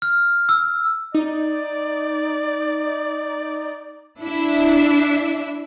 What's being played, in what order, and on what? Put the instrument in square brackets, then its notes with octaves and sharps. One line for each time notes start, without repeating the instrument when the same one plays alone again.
[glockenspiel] F6
E6
[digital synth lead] D#4 [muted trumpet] D5
[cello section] D4 E4 E5